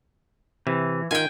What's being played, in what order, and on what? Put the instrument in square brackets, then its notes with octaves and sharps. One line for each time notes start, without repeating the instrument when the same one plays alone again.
[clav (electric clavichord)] C3 [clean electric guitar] E3
[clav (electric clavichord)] D#3 F4 [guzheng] G5 G#5